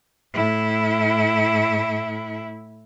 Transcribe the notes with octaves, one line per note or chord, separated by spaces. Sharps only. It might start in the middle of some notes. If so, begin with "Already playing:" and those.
A2 E4